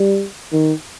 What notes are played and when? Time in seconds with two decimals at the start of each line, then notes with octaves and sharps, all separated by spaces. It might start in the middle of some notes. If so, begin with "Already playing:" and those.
Already playing: G3
0.52 D#3